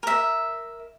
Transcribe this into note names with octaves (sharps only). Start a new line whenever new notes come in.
A#4 E5